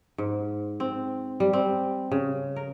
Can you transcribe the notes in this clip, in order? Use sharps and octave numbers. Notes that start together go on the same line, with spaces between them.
G#2
C4
G3
C4
C#3
A#4